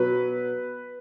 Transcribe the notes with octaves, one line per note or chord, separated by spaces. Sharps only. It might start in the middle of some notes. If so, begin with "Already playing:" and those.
Already playing: B2 F#3 B4